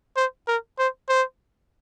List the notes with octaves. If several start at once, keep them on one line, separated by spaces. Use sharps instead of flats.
C5
A#4
C5
C5